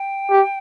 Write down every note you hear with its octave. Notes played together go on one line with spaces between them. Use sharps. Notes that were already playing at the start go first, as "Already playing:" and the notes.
Already playing: G5
G4